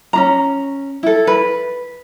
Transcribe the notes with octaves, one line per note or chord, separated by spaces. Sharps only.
C#4 D4 A#5
E4 A4
B4